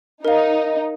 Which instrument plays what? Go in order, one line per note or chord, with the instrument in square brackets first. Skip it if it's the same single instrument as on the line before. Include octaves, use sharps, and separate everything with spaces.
[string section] D#4 [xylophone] A#4 F5 [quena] D#5